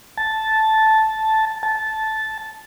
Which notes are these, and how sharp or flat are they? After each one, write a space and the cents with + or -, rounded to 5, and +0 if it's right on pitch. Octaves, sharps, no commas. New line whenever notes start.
A5 -5
A5 -10